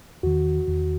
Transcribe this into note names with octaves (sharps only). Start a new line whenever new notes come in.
E2 D#3 F#4
E2 D#3